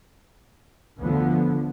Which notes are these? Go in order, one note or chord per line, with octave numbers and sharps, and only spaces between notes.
D2 D3 F3 B3